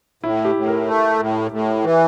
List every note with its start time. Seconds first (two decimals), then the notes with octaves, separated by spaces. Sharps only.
0.23 A2 E4
0.45 G4
0.56 A2
0.67 A#4
0.87 A3
1.19 A2
1.51 A2
1.84 E3